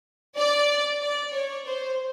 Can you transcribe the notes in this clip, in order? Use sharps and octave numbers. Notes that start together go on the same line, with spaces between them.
D5
D5
C#5
C5